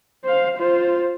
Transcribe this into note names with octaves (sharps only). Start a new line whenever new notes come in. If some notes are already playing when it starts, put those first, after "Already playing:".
C5 F5
F4 C5